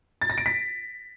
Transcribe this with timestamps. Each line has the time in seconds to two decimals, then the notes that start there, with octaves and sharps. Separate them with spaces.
0.22 A6
0.30 A#6
0.38 D7
0.46 B6